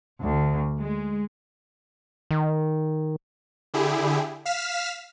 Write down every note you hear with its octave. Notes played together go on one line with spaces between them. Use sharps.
D2
G#3
D#3
D3 E4 G4 G#4
F5 F6 B6 E7